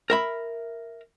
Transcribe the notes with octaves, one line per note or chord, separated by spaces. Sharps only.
A#4 E5 B5